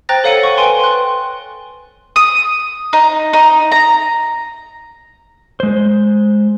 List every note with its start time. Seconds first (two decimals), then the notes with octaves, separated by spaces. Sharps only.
0.09 C5 G5 A#5 F#6 A6 A#6
0.24 A4 C#5 F5 F#5 C#7 D#7
0.43 F#5 C#6
0.57 B4 G5 G#5 C6
0.80 C6 F#6
2.16 D#6
2.93 D#4
3.33 D#4
3.72 A#5
5.60 G#3 C5